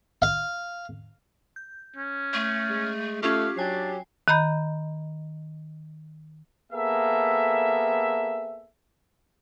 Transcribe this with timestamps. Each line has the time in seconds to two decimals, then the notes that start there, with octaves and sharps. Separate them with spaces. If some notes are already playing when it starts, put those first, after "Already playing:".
0.22 F5
1.56 G6
1.96 C#4
2.34 A3
2.69 G#3
3.23 A3 C#4 F4 G4 F5 C#6
3.57 F#3 D4 G5 G#5 C7
4.28 D#3 D#5 A#5 B5 G6
6.73 A#3 B3 G#4 A4 E5